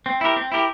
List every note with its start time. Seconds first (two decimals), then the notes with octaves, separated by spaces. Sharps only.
0.06 C4
0.21 E4 G4 A#4
0.36 C4
0.52 E4 G4 A#4